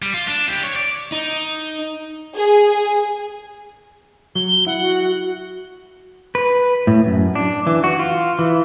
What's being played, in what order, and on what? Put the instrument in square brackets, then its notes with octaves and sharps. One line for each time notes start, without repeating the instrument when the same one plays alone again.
[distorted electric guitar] G3
F4
D4
E4 G4
C#5
D5
[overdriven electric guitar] D#4
[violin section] G#4
[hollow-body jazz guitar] F#3 [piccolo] G7
[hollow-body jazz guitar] E4 [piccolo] F#5
[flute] F#4
[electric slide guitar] B4
A2
F#2
D4
E3
F#4
F4
E3